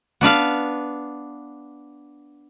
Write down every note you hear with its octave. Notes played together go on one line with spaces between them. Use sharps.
B3 D4 B4 F5